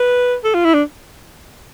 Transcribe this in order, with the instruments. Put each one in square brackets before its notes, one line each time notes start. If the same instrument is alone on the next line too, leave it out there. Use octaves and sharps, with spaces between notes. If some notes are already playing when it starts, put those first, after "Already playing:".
Already playing: [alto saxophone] B4
A4
F4
E4
D4